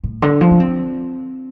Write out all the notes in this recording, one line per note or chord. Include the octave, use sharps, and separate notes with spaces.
A2
D3
F3
D4
C4